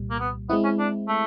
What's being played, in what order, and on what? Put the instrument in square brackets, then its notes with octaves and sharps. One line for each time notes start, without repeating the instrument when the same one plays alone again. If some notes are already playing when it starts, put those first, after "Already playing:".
Already playing: [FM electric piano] C2 A#2 G3
[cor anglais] A#3
B3
[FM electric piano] G#3 C4 E4 [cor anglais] B3
[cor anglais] C#4
D4
A3